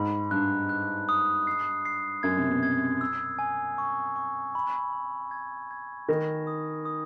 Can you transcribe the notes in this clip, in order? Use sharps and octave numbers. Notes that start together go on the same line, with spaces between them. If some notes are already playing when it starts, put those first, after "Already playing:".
Already playing: G#2 B5
G2 F#6
F#6
D#6
C7
C7
F#2 G#6
C3
B2
G#6
E6
G#5
C#6
C#6
B5
B5
G#6
G#6
D#3 A#6
D#6
D#6